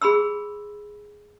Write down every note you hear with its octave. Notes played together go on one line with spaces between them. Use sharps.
G#4 B5 C6 E6